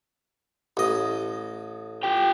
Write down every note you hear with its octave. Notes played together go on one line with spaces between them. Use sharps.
A1 D#5
F4 G4 G5